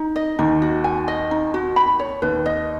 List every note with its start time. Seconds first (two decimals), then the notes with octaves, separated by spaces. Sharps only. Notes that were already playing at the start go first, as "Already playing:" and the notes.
Already playing: D#4
0.16 D#5
0.39 D#2 D#3 D#4
0.62 F#4
0.84 G#5
1.08 D#5
1.31 D#4
1.54 F#4
1.76 B5
1.99 C#5
2.22 D#2 D#3 B4
2.46 D#5